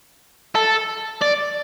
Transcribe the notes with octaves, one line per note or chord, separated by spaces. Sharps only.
A4
D5